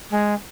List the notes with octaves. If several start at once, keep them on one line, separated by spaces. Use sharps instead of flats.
G#3